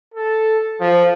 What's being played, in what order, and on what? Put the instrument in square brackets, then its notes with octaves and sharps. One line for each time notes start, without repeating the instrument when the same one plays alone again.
[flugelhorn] A4
F3